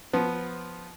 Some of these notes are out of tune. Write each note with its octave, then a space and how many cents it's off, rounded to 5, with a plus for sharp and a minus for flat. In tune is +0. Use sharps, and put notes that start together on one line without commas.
F3 +0 B3 +0